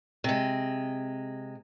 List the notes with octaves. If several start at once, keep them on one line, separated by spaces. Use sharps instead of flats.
C3 G#3